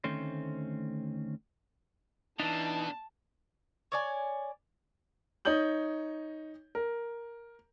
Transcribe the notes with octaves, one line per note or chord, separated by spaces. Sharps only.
D2 D#3 A3 C4 C#4 C5
B2 E3 D4 D#4 A5
C#5 D5 G#5
D#4 C#5 D#6 G6 F#7
A#4